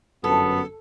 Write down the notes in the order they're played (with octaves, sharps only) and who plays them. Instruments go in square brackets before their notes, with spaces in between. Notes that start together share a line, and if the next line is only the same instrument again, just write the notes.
[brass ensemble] G1 F#2 [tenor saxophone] B3 [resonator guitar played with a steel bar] A4